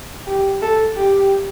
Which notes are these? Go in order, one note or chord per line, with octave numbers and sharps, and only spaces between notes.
G4
A4
G4